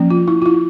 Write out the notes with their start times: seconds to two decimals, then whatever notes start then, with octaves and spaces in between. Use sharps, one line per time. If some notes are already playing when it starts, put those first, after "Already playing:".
Already playing: F3 A#3 C#4
0.10 F4
0.28 E4
0.42 F4
0.46 E4